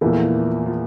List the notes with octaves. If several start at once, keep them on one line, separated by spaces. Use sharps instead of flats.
E2 A#2 E3 F3 A3 E4 A#4
F3